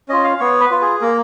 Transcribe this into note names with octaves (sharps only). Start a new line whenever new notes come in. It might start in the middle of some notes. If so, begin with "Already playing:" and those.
C#4 F4 D#5
F5
B3 C#5
B4
F4
G#4
A#3 A#4